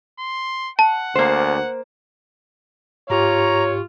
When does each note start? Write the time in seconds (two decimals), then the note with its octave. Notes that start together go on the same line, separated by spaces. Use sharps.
0.20 C6
0.79 F#5 A5
1.15 D2 A#3 C5
3.10 G#2 F4 G4 C#5 A#5 C#6